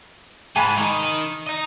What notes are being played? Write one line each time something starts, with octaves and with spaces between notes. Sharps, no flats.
G#2 G#5 A5 B5
D#3 D#4 A#5
D#5 A#5